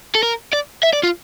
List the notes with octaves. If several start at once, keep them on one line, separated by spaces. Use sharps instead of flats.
A4
A#4
D5
E5
D5
F4